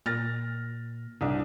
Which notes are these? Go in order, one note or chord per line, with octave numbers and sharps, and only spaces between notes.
A#2 F6 A6 A#6
C2 D4